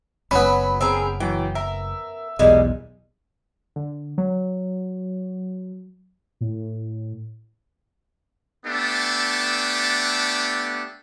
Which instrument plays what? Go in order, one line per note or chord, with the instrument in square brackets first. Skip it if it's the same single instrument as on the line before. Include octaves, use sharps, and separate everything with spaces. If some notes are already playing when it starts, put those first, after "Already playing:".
[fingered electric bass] F#1 [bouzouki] F#3 [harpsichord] B3 C#4 [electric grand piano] B5
[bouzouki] C4 G#4 A#4
[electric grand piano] E3 F#3 [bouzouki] G5
[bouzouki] A#4 [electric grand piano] E5
[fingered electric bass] B1 E2 [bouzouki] A#2 G3 G#3
[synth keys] D3
F#3
[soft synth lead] A2
[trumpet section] A3 B3 D4 G4 A4